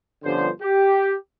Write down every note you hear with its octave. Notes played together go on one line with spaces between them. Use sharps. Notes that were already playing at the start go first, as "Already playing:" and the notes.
G1 G2 D3 F3 C#4 C5
G4